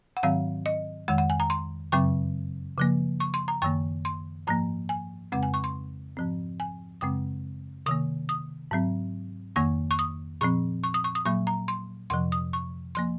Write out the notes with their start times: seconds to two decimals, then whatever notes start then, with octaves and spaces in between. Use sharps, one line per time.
0.17 F#5
0.23 G#2 D#3 F#3 C4 F5
0.66 D#5
1.08 F2 D#3 G#3 F#5
1.18 F#5
1.30 G#5
1.40 A#5
1.50 C6
1.92 F#2 C#3 F#3 C4 C#6
2.78 C#3 F3 A#3
3.20 C#6
3.34 C6
3.48 A#5
3.62 F#2 D#3 A#3 C#6
4.05 C6
4.47 G#2 F3 A#3 A#5
4.89 G#5
5.32 F2 C#3 G#3 C4 F#5
5.43 G#5
5.54 C#6
5.64 C6
6.17 G#2 F3 C4
6.60 G#5
7.01 F#2 C#3 G#3 C4 D#6
7.86 C3 D#3 A#3 D#6
8.29 D#6
8.71 G#2 F#3 C4
9.56 F2 D#3 A#3 C#6
9.91 C#6
9.99 D#6
10.41 A#2 F3 C4 C#6
10.84 C#6
10.94 D#6
11.04 C#6
11.15 D#6
11.25 A#2 F#3 A#3 C#6
11.47 A#5
11.68 C6
12.10 F2 C3 F3 C6
12.32 D#6
12.53 C#6
12.95 F3 A#3 C6